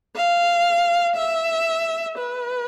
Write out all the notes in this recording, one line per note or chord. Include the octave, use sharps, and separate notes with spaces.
F5
E5
B4